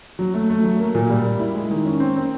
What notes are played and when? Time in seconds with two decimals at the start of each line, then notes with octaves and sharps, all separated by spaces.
0.19 F#3
0.34 A3
0.50 A3
0.64 F#3
0.80 A#3
0.95 A#2
1.10 G3
1.25 G3
1.40 E4
1.55 G#3
1.71 D#3
1.85 C#4
2.00 C4
2.16 C4